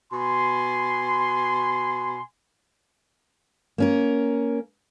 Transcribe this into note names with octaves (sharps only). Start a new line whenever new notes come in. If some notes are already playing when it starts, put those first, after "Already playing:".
B2 G#5 B5 C6
A#3 C#4 A#4